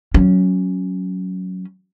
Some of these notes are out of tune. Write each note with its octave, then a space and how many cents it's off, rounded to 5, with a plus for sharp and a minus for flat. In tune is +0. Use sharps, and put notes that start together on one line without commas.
F#3 +0 C#4 +0